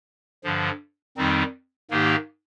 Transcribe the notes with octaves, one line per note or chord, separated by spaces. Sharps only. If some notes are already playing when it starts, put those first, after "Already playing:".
G2 D3 F3
F2 D#3 G3 C4 D#4
G#2 D#3 A#3 D#4 G4